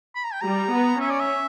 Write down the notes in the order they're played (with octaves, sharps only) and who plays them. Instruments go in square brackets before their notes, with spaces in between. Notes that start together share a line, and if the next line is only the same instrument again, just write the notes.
[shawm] B5
A#5
G5
[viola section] G3 [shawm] A#5
[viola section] B3
[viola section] C#4 [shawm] E5
[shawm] D5
E5